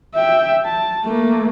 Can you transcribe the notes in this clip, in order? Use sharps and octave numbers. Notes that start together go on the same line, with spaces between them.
E5 G5
A5
A3 A#3